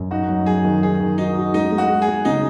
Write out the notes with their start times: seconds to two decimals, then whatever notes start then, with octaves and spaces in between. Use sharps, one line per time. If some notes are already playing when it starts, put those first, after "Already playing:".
Already playing: F#2
0.11 D#4 F#4
0.29 F#3
0.46 F#3 G#4
0.65 D#3
0.82 D#3 G#4
1.00 D#3
1.18 D#4 F#4
1.36 F#4
1.54 G#3 D#4
1.72 G#3
1.78 F#4
1.90 G#3
2.02 G#4
2.08 G#3
2.25 C#3 D#4